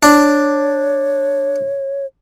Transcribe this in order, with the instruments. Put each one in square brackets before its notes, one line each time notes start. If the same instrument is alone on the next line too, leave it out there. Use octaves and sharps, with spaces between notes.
[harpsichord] D4 [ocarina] C#5